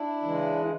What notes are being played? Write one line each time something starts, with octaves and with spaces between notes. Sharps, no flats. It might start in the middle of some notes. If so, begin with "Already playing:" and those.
Already playing: D4 E4
C#3 E3 G#3